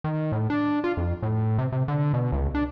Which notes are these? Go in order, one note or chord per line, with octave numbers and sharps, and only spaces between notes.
D#3
A2
D4
F4
F2
A2
C3
C3
D3
B2
C#2
D4